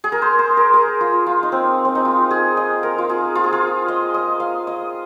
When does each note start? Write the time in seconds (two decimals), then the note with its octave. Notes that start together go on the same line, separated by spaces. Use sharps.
0.04 G#4
0.12 A#4
0.22 C5
0.39 C5
0.57 A#4
0.74 G#4
1.01 F4
1.26 F4
1.43 D#4
1.52 C4
1.85 C4
1.95 D#4
2.05 F4
2.31 G#4
2.57 D#5
2.83 A#4
2.98 F4
3.09 G#4
3.35 F4
3.44 G#4
3.53 F4
3.88 D#5
4.14 D#5
4.40 F5
4.67 D#5